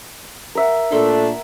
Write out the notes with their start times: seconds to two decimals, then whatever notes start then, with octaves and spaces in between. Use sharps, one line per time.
0.55 A#4 E5 F#5
0.92 A#2 A3 D4 A4 C6